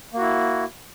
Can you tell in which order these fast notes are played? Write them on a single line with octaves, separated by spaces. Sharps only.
A#3 F#4 E4